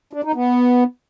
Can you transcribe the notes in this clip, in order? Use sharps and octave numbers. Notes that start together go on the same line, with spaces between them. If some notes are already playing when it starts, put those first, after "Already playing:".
D4
D#4
B3